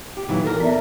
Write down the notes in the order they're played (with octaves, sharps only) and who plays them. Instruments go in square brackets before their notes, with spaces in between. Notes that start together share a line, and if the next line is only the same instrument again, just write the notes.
[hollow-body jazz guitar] G4
[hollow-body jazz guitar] A#2 E3 F#3 [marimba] D#4
[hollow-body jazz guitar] A4 A#4
[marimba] B3 D5 E5